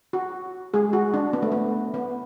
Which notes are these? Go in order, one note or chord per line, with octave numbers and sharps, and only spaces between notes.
F#4
G#3 G#4
F#4
D4
B3
A3
B3
B3